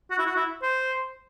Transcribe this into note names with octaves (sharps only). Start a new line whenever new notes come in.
F#4
E4
F#4
E4
C5